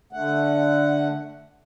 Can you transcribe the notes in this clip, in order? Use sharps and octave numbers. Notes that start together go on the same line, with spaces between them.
D3 A3 F#5